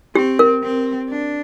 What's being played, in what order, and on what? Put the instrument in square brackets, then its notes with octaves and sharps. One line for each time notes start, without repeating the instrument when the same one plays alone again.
[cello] C4 [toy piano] G4
[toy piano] A#4
[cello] C4
D4